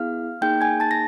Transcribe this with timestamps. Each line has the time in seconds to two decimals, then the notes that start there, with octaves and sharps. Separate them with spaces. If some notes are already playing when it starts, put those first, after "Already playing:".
Already playing: B3 E4 G#4 F5 F6
0.41 A#3 D#4 G#4 G5 G6
0.61 G#5 G#6
0.80 A5 A6
0.91 A#6